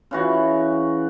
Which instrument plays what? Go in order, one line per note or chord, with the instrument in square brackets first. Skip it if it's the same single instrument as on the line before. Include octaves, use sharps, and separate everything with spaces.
[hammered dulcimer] C#3 E3 F#4